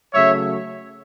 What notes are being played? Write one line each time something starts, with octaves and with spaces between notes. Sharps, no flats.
C#3 F#3 A3 C#5 E5